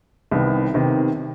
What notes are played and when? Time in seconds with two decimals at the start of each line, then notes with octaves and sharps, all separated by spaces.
0.31 C2 C3 D#3 B3
0.74 C3 D#3 B3